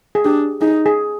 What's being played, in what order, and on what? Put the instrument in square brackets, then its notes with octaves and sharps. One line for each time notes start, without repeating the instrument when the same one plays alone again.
[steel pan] G#4
[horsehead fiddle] D4 [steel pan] G4
[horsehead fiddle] D#4 [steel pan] G#4
[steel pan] G#4